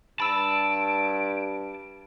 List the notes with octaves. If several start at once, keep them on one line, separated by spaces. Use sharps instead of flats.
G2 A5 B5 E6 D7